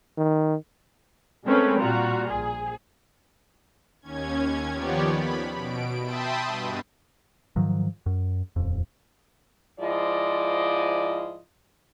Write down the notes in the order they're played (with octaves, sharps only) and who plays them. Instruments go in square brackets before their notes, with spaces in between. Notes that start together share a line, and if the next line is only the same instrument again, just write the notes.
[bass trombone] D#3
[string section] G#3 A3 C4 C#4 A#4 B4
A#2 G3 F4 F#4 A#5
A#1 G#4
[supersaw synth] D#2 C#4 G#6
D#3 F3 B3 G4 C#5 D5
B5
B2 D7
E5 G5 A5 B5 C6 D#6
G2 B2
[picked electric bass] G#2 D#3 F3 F#3
F#2
D#1 F2
[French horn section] G#2 F3 E4 F4 D5 D#5